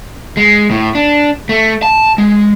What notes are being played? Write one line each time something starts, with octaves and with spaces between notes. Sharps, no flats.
G#3
A2
D4
A3
A5
G#3